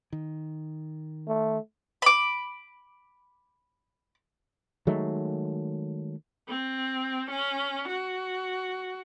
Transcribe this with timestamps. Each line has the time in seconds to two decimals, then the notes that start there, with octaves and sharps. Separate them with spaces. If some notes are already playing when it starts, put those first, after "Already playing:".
0.13 D#3
1.28 A3
2.02 B5 D6
4.87 D#3 F#3 G#3 A3
6.48 C4
7.30 C#4
7.88 F#4